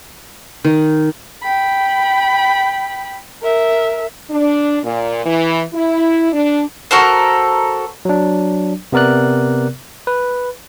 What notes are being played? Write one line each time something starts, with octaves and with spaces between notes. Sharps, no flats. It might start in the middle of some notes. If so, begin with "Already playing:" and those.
D#3
G5 B5
A#4 E5
D4
A#2
E3
E4
D4
F#4 A4 A#4 C5
F#3 D4
C3 B3 A#4 D5 F#6
B4